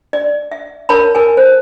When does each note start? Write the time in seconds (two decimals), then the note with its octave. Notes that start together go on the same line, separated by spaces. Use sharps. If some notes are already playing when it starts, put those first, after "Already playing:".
0.13 D5
0.51 E5
0.89 A#4 C#5 A5 B5
1.15 A#4 G#5
1.37 C5